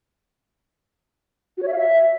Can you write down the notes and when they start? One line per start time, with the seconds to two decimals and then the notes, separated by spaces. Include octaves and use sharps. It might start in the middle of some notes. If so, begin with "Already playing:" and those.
1.57 F#4
1.63 C#5
1.68 E5
1.73 F5
1.78 E5